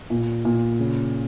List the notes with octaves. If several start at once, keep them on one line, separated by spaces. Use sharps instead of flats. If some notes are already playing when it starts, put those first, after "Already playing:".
A#2
A#2
C#3